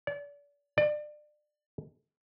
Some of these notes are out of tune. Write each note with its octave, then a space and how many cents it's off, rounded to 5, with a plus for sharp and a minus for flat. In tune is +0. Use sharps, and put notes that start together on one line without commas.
D5 -35
D5 +30